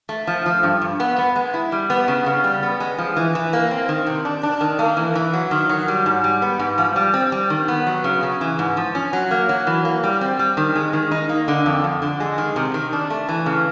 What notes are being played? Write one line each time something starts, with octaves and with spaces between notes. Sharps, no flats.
A3
F3
F3
G2
G2
B3
B3
G#3
E4
G3
B3
C#3
C#3
G3
B3
G#3
F3
E3
E3
A#3
C4
D#3
C3
D4
D4
D#3
A#3
E3
E3
F#3
D#3
F#3
G3
G#2
G3
B3
G#2
F3
G3
C4
G3
D#3
B3
F#3
C#3
C#3
E3
G#2
F3
C#4
F#3
A#3
F#3
E3
A#3
G3
C4
G3
D#3
G#3
D#3
D#4
A#3
D3
F2
F2
D3
G#3
D#3
C3
D#3
D4
A3
E3
C#3